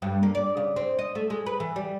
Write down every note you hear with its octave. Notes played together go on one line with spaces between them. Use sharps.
G2
A#3
D5
C#3
C4
D#5
A3
G#3
B4
E3
G3